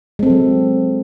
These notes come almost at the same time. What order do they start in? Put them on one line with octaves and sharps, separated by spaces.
G#3 C4 A4 F#3